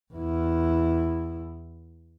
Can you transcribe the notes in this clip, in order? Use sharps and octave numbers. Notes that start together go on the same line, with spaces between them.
E2 E4